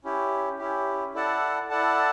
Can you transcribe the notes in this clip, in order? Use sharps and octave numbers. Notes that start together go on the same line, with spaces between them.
C#4 E4 G4
C#4 E4 G4
E4 A4 D5 F#5 A5
E4 A4 D5 F#5 A5